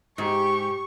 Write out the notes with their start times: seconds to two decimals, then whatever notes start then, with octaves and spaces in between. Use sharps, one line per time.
0.18 G#2 G4 C#6